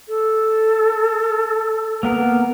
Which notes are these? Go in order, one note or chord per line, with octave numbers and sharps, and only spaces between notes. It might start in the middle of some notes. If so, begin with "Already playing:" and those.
A4
A#3 B3 A#4